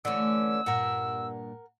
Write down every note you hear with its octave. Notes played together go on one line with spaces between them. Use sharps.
D3 E3 A3 C#4 E6
G2 A#2 A#4 F#5